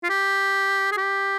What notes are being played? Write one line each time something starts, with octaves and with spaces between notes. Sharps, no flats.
F4
G4
G#4
G4